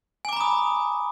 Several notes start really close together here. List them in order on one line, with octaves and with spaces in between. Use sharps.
G#5 D6 A#5 B5 D#6